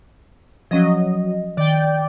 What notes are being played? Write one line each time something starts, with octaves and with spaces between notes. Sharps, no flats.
F3 F#3 C#4 D#5
D#3 D5 G5